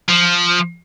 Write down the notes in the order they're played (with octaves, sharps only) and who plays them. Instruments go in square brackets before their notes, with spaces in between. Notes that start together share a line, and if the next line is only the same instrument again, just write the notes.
[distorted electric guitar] F3